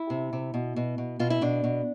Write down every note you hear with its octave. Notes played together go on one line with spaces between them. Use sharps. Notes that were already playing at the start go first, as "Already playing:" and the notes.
Already playing: E4
C3
C3
B2
B2
B2
B2 F4
E4
B2 D4
B2